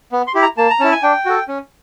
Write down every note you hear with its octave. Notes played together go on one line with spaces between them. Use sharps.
B3
C6
E4 G4
A#5
A#3 A5
A#5
C#4 E4 A5
G#5
D4 G5
F#4 A4
C#4